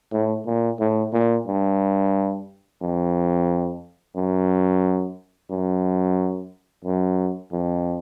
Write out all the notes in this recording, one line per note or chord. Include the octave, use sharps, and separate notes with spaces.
A2
A#2
A2
A#2
G2
F2
F#2
F#2
F#2
F2